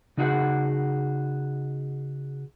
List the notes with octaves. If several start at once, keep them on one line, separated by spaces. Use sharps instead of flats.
C#3 D#4 F#4 G#4 B4 F#5